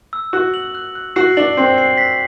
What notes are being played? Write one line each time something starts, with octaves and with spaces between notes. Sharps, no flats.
E6
F#4 F#6
F#7
F#6
F#6
F#4 C7
D4 F#7
C4 C7
C7
B6